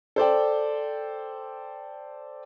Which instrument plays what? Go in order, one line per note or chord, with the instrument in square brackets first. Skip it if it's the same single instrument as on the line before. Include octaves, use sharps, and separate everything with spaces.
[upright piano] A4 C5 D5 G5